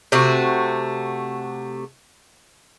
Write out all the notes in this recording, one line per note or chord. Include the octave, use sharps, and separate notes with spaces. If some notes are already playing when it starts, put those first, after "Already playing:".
C3 A3 F#4